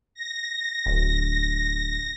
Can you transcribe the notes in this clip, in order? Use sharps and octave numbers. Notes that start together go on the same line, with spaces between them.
A#6
D1